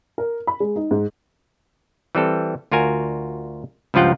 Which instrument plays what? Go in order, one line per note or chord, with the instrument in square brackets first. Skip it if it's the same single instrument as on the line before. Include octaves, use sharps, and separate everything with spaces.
[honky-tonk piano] A#4
B5
G#3
D#4
G#2
[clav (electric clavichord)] E3 G3 C4 A4
D2 F4 F#4 A#4 G#5
C#2 G2 F3 F4 F#5 G5